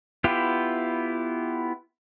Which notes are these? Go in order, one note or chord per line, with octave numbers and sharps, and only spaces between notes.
B3 E4 F4 G4